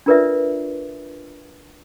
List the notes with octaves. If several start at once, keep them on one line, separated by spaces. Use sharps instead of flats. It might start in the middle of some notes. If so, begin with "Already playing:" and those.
D4 F4 A#4 B4 D5 E5